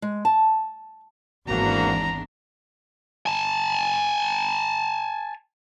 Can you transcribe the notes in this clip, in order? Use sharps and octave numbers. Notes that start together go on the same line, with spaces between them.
G#3
A5
G#1 E2 A#3 C4 D4 F#4 A#5
G#5 A5